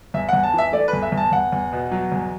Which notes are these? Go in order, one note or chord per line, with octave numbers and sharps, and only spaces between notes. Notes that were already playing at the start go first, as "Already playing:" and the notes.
E2 E5
E2 F#5
A5
E3 E5
A3 D5
B4
E2
E5
E2
A5
E2 F#5
E2
B2
F#3
E2